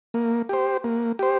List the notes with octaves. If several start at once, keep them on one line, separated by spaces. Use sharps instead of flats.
A#3
G4 C5
A#3
G4 C5